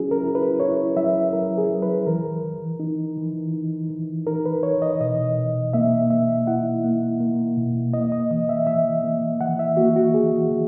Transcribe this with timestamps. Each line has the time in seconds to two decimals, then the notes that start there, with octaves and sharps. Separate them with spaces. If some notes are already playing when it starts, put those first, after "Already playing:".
Already playing: F#3 C#4 E4 F#4 G#4
0.11 A#4
0.24 E4
0.35 B4
0.60 E4 C#5
0.97 F#3 E5
1.33 F#3 A#4
1.58 G#4
1.70 F#3
1.82 B4
2.07 E3 A#4
2.44 E3
2.80 D#4
3.17 E3
3.53 D#4
3.90 E3
4.27 D#4 A#4
4.46 B4
4.63 E3 C#5
4.82 D#5
5.00 B2 D#5
5.37 B2
5.73 A#3 E5
6.10 A#3 E5
6.47 E4 F#5
6.84 A#3
7.20 A#3
7.57 B2
7.94 A#3 D#5
8.12 D#5
8.31 E3 D#5
8.49 E5
8.67 E3 E5
9.04 A#3
9.40 E3 F#5
9.59 E5
9.77 A#3 F#4
9.96 F#4
10.14 E3 G#4
10.51 E3